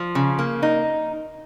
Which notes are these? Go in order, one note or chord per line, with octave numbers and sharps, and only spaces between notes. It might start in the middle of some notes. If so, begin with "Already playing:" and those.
Already playing: F3
C#3
A#3
D#4